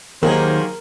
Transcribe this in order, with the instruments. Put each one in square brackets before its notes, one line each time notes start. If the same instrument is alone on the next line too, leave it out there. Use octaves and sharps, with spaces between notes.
[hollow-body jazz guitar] D#2 [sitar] D#3 A#3 G#4 [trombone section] F#3 C5 [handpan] A#4